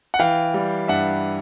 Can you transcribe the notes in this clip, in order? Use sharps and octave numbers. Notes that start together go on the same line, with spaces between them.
F#5
E3 F5 G5
G3
G2 E5 F#5